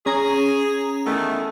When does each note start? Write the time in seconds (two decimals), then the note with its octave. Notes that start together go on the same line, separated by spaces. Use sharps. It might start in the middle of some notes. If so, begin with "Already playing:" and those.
0.06 C#4 G#4 A#5
1.06 E2 D#3 A3